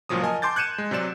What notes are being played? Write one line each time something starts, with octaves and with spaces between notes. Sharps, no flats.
C#2 A#2 F3 F#3 D#6
A#4 D#5 G#5 A5
A5 C6 D6 G6 A6
F#6 G#6 C#7 D#7 E7
G#3
C3 F#3 D5 E7